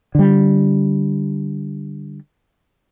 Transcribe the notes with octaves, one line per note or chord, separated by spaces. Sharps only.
D3 G3